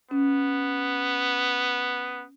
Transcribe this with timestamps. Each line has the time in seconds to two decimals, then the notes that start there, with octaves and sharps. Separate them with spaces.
0.11 B3 C#4